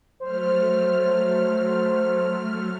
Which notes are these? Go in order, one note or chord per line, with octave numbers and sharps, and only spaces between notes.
F#3 A3 C5 F6